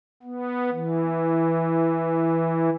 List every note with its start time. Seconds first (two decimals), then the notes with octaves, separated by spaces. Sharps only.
0.23 B3
0.72 E3